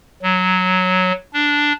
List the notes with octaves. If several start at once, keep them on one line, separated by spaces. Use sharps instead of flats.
F#3
D4